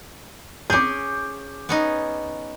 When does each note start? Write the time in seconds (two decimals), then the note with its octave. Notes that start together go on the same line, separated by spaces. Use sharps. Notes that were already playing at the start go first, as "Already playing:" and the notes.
0.70 C#4 G#4 D6 G6
1.69 B3 C#4 D#4